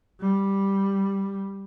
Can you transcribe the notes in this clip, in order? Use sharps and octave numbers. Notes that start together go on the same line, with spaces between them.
G3